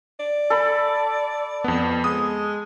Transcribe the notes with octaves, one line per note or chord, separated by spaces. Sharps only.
D5
A4 B5
F2 B3
G#3 D#6